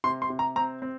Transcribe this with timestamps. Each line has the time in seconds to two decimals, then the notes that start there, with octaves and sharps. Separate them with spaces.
0.04 C3 C6
0.22 C6
0.30 C3
0.39 A#5
0.56 C4 A#5
0.82 C4